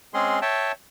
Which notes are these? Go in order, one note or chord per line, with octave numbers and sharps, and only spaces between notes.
G#3 C4 C#4 G#4 C6
C#5 E5 G5 A5